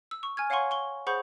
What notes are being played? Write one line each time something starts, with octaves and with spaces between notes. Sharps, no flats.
E6
C#6
G#5 F6 G#6
C#5 F5 F#5 G#5 C6 C#6
C#6 G7
G#4 C5 F#5 B5 C#6 G6